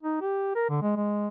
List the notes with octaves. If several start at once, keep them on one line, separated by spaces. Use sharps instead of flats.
D#4
G4
A#4
D3
G#3
G#3